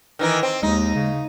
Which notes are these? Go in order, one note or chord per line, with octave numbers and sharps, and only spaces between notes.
D#3 E3 D#4
C4
D#2 G#3 D#4
C#3